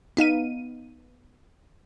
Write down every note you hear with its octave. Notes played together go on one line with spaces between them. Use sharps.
B3 D#4 F5 D#7